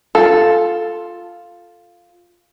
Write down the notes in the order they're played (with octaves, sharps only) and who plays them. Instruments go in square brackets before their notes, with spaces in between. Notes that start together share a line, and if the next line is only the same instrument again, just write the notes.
[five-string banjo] F4 A4